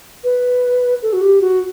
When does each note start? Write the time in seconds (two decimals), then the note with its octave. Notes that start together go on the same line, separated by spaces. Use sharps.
0.24 B4
1.02 A4
1.13 F#4
1.22 G4
1.41 F#4